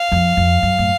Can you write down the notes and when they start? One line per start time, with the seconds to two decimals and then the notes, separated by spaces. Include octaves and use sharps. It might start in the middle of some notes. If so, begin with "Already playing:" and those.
Already playing: F5
0.12 F2
0.37 F2
0.63 F#2
0.78 A2